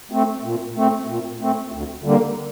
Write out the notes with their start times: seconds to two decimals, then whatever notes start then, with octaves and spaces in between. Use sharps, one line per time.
0.12 A3 C4
0.44 A#2
0.76 A3 C4
1.07 A#2
1.40 A3 C4
1.72 D2
2.04 D3 G3 A#3